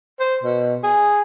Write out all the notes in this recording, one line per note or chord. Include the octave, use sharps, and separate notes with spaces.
C5
B2
G#4